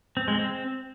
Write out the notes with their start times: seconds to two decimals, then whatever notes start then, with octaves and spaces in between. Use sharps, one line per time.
0.17 C4
0.28 G#3
0.39 C4